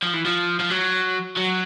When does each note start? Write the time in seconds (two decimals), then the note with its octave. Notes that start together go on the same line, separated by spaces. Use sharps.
0.03 F3
0.14 E3
0.25 F3
0.60 F3
0.70 F#3
1.37 F#3